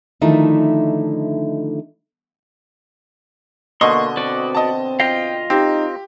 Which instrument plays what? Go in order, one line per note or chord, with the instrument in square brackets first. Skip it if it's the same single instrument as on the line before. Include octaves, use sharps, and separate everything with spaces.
[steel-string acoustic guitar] D3 D#3 F3 A3 D#4 E4
[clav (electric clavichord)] B2 D3 [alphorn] A#3 [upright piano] D#5 [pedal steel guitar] C6 C#6
[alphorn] C4 [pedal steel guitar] F#4 B4 D5
[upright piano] D#5 A5
[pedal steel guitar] F4 D#5 F5 [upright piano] G5
[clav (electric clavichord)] C4 [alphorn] D#4 [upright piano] G4